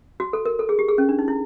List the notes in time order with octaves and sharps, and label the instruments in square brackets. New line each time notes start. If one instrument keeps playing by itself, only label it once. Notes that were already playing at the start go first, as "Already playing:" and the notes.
[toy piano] F#4
A4
A#4
A4
G#4
G4
G#4
C#4
D4
D#4
E4